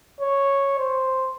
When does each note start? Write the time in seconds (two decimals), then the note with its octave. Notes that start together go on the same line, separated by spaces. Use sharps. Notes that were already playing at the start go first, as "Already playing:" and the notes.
0.21 C#5
0.79 C5